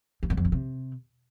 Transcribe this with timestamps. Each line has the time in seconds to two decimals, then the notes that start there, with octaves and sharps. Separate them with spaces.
0.23 E2
0.30 F#2
0.37 F2
0.45 G2
0.52 C3